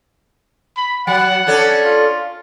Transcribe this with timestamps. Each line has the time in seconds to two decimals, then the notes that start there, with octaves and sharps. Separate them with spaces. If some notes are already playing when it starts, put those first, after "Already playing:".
0.77 B5
1.07 F#3 F#5
1.47 C#4 D4 A4
1.84 F4